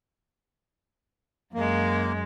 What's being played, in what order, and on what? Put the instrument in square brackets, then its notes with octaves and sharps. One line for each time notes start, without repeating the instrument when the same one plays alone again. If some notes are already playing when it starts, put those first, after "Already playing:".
[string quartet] F#2 G#3 [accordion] A#3